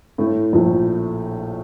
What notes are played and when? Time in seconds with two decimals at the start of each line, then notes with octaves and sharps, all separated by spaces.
0.18 A2 A3
0.53 A#1 A#2